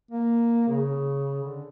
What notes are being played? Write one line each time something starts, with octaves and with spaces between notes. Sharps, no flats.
A#3
C#3
D3